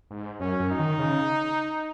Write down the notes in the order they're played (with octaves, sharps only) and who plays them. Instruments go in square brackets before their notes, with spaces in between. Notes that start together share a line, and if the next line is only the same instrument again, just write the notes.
[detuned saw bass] G#2
[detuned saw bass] F#2 [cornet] C#4
[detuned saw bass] F#2
[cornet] D#4
[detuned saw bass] D#3
C#3